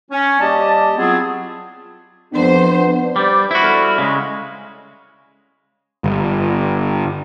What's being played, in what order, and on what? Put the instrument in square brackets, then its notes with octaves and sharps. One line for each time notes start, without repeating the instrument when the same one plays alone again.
[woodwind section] C#4
D#2 G3 G4 D#5 A5
F#3 B3 C4 E4 F4 G#4
[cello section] F2 C5 [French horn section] B3 D4
[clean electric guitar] G3 [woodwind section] G4 C5 D5
[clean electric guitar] E4 F#4
[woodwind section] D3 G3 F6
[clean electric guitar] C#3 [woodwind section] G#3
[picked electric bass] G1